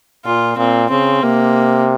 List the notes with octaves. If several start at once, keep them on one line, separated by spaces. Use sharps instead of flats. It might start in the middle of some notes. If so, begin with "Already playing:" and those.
A#2 F4
A#2 C4
C#3 C4
C3 A#3